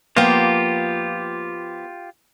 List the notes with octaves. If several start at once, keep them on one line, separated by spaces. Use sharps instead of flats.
F3 A#3 B3 F4 G4 G5